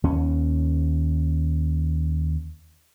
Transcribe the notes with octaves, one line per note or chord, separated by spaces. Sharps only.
D#2 C#4